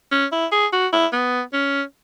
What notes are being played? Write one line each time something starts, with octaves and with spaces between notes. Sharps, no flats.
C#4
E4
G#4
F#4
E4
B3
C#4